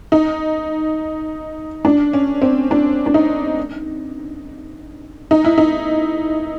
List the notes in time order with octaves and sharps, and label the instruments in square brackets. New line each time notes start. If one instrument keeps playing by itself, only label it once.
[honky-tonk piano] D#4
D4
C#4
C4
D4
D4
D#4
D#4
E4
D#4